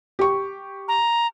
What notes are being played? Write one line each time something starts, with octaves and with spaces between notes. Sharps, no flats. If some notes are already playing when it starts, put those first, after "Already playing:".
G4 C#6
A#5